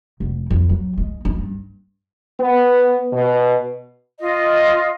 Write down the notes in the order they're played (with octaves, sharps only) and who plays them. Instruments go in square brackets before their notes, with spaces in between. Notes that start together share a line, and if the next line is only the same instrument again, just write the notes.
[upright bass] F1
F2
F#3
G#3
D#4
G2
[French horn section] B3
B2
[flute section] F4 D#5